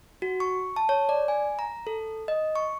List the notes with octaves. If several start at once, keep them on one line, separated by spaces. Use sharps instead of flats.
F#4
C#6
A5
C#5
D5
G#5
A#5
A4
D#5
C#6